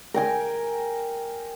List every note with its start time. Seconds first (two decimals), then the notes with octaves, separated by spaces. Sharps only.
0.14 A#4 G5 G#5